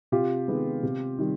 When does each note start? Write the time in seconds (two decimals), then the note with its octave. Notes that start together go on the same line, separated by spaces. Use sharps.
0.12 C3 F4 G4
0.48 D#3 G#3 B3
0.83 C3
1.19 D#3 G3